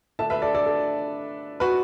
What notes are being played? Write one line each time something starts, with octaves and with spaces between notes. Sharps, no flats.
D3 A3 D4 E5 A5
B4 E5
A4 D5
A4 D5
A4
F#4 B4